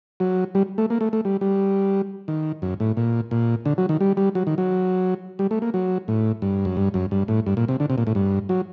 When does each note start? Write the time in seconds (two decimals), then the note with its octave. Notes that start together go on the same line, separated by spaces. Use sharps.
0.20 F#3
0.55 G3
0.78 A3
0.90 A#3
1.01 A3
1.13 A3
1.25 G3
1.41 G3
2.28 D#3
2.62 F#2
2.80 A2
2.97 A#2
3.31 A#2
3.66 D3
3.78 F#3
3.89 D#3
4.01 G3
4.17 G3
4.35 F#3
4.47 D#3
4.58 F#3
5.39 G3
5.51 A3
5.62 A#3
5.74 F#3
6.08 A2
6.42 G2
6.65 F#2
6.77 G2
6.94 F#2
7.11 G2
7.28 A2
7.46 G2
7.57 A#2
7.68 C3
7.80 D3
7.90 C3
7.98 A#2
8.07 A2
8.15 G2
8.49 F#3